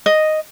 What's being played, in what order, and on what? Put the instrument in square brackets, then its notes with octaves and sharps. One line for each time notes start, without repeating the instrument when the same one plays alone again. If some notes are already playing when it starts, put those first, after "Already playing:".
[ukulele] D#5